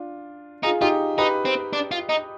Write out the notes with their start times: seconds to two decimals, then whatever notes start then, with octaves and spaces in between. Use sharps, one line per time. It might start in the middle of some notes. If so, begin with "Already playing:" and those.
Already playing: D4 F4
0.63 D#4 F4 G#4
0.81 D#4 F4 G4
1.18 D#4 G4 B4
1.45 C4
1.73 D4
1.91 F4
2.09 D#4